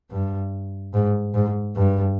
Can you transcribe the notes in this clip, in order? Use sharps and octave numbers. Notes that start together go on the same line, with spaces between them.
G2
G#2
G#2
G2